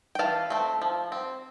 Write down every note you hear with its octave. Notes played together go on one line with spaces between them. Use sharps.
G5
E3 F5 A5
A3 C4
F3
C4